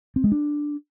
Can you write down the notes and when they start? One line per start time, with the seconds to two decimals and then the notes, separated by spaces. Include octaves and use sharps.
0.16 C4
0.24 G#3
0.32 D4